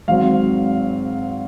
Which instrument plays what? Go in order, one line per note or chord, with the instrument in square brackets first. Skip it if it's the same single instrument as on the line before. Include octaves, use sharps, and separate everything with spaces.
[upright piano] G#1 G#2 F#3 C4 F5